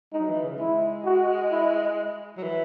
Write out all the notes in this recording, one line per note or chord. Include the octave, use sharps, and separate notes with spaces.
G#3 D#4
F#3
E3
C#3
G#3 E4
F#4
E4
F#3
E3